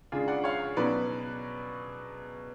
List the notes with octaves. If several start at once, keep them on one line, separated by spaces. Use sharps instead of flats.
C#3 G#3 D4 F4 G#4
D5 F#5
C#5 F5
B2 F#3 C#4 B4 D5